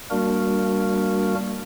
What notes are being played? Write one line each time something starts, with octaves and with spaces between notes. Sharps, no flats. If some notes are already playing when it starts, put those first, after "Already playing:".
G3 A#3 D4 F#4 A#4